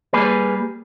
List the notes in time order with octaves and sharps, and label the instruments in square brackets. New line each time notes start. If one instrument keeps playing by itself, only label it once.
[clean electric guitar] G3 A#3 G#4 B4